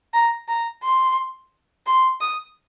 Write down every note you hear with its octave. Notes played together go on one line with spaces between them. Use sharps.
A#5
A#5
C6
C6
D#6